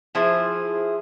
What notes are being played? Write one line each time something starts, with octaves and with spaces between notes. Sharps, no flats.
F3 E4 G#4 C5